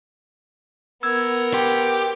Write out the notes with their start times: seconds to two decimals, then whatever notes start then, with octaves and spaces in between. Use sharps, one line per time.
1.03 B3 A#4 E6 G#6
1.54 G4 C6